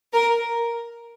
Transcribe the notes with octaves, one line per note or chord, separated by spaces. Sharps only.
A#4